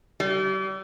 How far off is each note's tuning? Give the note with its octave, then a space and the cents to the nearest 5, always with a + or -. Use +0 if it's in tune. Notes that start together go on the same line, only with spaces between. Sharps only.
G3 -40